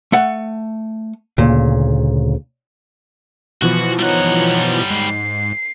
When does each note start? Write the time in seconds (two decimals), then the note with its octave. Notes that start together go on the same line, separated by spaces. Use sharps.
0.12 A3 F#5
1.38 D2 A#2 C#3
3.62 B2 E3 F3 F#4
3.99 G3 D#4 C#5 F#5
4.90 G#2 C7